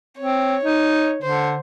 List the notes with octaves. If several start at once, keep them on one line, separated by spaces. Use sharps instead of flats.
C4 C#5
D#4
D3 C5